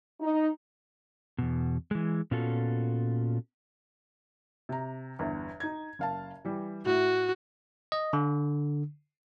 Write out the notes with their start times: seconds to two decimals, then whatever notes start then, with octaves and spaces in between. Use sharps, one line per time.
0.21 D#4
1.39 E2 B2
1.91 E3 G#3
2.31 A#2 B3 C#4 F4 F#4 A4
4.69 C3 A#5
5.19 G1 E2
5.60 D#4 G#6
5.99 F#1 F5 A5
6.45 E3 G3
6.86 A2 E4 F#4
7.92 D#5
8.13 D3